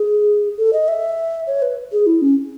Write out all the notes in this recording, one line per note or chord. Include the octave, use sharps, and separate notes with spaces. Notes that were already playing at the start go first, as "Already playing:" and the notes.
Already playing: G#4
A4
D#5
E5
C#5
B4
G#4
E4
C#4